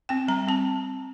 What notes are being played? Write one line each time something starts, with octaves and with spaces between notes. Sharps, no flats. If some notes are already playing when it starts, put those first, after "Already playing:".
C4 G5
G3 A#5
C4 A5